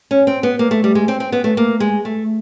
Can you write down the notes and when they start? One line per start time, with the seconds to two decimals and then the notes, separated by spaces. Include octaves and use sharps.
0.11 C#4
0.27 C4
0.43 B3
0.59 A#3
0.71 A3
0.84 G3
0.95 G#3
1.08 C4
1.20 C4
1.32 B3
1.44 A3
1.57 A#3
1.80 G#3
2.05 A3